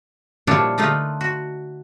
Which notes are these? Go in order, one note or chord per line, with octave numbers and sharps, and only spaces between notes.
A#2 F3 G3 D4 E4 C#5
D3 A3 D#4 F4 B4
F#4